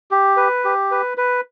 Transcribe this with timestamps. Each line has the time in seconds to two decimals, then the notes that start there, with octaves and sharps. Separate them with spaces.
0.11 G4
0.37 B4
0.64 G4
0.91 B4
1.18 B4